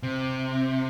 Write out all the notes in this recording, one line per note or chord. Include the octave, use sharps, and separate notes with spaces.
C3